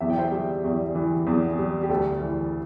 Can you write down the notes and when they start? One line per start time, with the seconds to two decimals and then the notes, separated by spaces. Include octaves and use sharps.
0.01 E2 E5
0.10 G5
0.18 C5 E5
0.32 G3
0.64 E2
0.95 E3
1.27 E2
1.59 G3
1.83 G4
1.89 D2 A4
2.21 E3